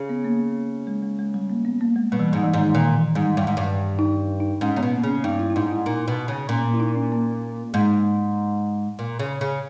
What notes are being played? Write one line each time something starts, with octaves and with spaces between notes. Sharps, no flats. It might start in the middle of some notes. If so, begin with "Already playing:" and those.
Already playing: C#3
B3
A#3
G#3
G#3
G#3
G3
A#3
B3
A#3
G#3
B2 G3
E3
G3
G#2
E3
G#2 D#3
A#2 D#3
E3
G#2 G3
G2
G#2
G2
D#4
D#4
G#2 C#4
C#3 B3
B2
A#3
C#3 C#4
G2 D#4
E4
E4
G#2 D#4
E4
A#2 D#4
B2
C#3
A#2 C#4
A#3
E4
D#4
C#4
A#3
G#2 G#3
A#2
C#3
C#3